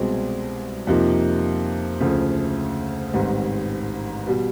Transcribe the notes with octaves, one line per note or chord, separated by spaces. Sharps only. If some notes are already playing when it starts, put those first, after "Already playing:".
Already playing: C2 B2 G#3 C4
F2 C3 F3 A#3 D#4
D2 C#3 F3 A3
A1 G#2 D#3 G3 C4
B2 G3